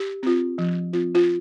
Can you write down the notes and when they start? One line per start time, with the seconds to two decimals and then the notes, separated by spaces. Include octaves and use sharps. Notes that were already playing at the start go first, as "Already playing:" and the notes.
Already playing: G4
0.23 C4 F4
0.58 F3
0.93 C4 F4
1.15 F4